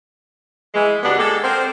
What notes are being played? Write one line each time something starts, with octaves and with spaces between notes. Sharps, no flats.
E3 G#3
D2 B3 D4 G4 F#5
G#3 A#3 G4 A4
C4 A#4 C5